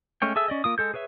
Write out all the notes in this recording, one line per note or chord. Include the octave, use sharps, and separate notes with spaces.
G#3 A3 C#4 C#5 G5
G#4 A4 E5 E6
C#4 D5 D#5
A#3 F4 D#6
G#3 A4 G6
G#4 B4 C#5 E5